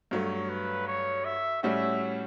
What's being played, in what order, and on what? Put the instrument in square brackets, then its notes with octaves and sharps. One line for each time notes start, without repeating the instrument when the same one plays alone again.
[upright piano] G2 F#3 A3 [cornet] C#5
[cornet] B4
C#5
E5
[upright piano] A2 G3 C#4 F#4 [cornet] E5